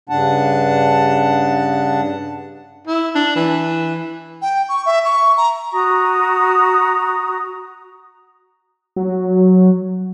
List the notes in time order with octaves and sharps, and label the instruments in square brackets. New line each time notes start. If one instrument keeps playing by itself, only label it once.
[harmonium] G2 C#3 D4 F#5 A5
[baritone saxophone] E4
D4
E3
[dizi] G5
C#6
E5
C#6
A#5
[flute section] F#4 A#5 D#6
[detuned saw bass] F#3